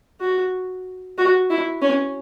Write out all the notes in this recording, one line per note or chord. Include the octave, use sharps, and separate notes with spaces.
F#4
F#4
E4
C#4